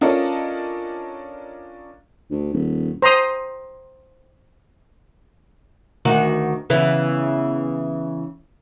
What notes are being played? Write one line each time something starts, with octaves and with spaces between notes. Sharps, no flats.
C#4 D4 F4 A4 A#4 D#5
D2
D#1
C5 A#5 C6 D#6
D2 D#3 F#4
C#3 E3 B3